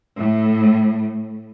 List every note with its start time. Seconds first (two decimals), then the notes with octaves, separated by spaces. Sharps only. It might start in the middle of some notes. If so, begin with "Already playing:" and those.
0.18 A2